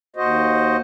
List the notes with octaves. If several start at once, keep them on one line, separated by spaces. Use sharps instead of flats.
D#2 F#4 C5 D#5